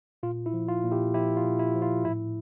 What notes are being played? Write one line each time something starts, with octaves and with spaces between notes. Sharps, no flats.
A#2 F4
E4
F3
F4
A#2
E4 G4
F3 E4 G4
F4
A#2
E4
F3
F4
A2 E4